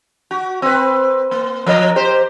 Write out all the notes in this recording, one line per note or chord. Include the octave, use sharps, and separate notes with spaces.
F#4
C4 B4
A#3
F3 A#4 D#5
G4 C5